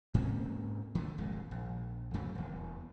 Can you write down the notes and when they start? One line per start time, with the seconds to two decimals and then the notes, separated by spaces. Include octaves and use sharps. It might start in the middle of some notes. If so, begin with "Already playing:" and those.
0.14 G#2 A#3 C4 C#4
0.95 D3 E3 G#3 A3
1.18 D#1 G#1 F2 G#3
1.51 A#1
2.14 F2 C#3 F#3 A3
2.35 D#1 E2